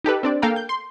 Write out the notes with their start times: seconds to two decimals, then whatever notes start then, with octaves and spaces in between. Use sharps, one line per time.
0.04 D#4 G4 A4 B4
0.23 C4 D4 D5
0.42 A#3 A4 F5 G5 A#5
0.56 G6
0.69 C6